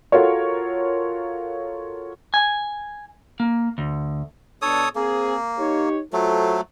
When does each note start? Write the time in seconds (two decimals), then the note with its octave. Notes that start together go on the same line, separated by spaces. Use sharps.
0.12 F4 F#4 A4 A#4 C#5
2.34 G#5
3.40 A#3
3.78 D2
4.62 B2 D4 A4 C#5 D#6
4.95 A#3 C4 G#4
5.58 D#4 G4 C#5
6.13 F#3 A3 F4 A4 C5